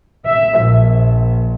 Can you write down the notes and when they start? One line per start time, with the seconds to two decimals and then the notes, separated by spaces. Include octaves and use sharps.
0.28 E5
0.60 A#1